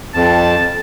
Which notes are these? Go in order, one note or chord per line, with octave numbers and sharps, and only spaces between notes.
F2 A5